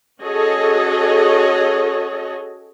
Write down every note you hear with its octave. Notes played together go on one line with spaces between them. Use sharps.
C#4 F#4 G#4 A4 C#5 D#5